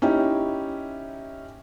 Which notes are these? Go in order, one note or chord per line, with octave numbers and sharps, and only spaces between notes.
C#4 D#4 E4 G4